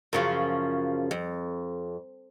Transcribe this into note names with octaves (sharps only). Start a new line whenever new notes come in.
F#2 C#3 F3
F2